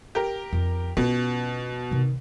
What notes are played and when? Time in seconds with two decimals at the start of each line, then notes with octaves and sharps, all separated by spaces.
0.15 G4 A#4
0.53 F2
0.97 B2 C#4 F4
1.91 C3 D#3